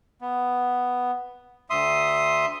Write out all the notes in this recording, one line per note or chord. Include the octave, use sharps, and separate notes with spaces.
B3
D2 E5 C6 D#6